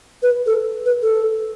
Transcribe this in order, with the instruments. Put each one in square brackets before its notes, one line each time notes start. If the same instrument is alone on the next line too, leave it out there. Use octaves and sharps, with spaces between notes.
[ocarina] B4
A4
B4
A4